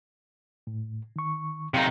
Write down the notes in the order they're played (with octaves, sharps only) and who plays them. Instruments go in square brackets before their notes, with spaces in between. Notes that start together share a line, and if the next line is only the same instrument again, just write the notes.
[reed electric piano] A2
D#3 C#6
[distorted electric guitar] C3 D#4 [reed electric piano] F5